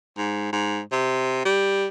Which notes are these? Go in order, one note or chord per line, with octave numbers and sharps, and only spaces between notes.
G#2
G#2
C3
G3